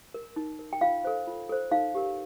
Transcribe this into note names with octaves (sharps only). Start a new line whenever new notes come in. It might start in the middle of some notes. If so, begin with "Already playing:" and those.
A#4
D#4
A#4
G5
F4 F5
A4 C5
F4
A4 C5
D#4 F5
G4 A#4